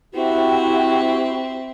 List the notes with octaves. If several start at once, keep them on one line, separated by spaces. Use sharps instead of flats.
C4 E4 F#4 G4 E5